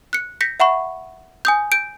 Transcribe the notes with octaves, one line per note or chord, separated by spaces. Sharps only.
F#6 C#7
G6 A#6 B6 C#7
E5 F#5 B5 C#6
G#5 D#6 G6
G6 D7